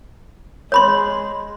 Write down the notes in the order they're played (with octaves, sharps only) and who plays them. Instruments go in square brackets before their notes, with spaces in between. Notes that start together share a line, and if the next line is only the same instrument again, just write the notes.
[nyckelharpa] G#3 [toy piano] C#5 B5 C6